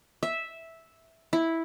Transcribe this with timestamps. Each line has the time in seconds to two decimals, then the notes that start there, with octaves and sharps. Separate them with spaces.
0.23 E5
1.33 E4